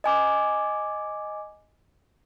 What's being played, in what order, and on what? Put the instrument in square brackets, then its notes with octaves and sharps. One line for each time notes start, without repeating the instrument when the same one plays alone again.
[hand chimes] D#5 G#5 D6